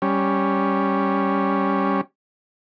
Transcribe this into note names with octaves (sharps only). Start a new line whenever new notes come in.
G3 C#4